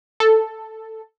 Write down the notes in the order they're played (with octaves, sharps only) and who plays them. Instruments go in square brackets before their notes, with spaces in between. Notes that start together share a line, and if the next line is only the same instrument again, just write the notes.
[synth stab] A4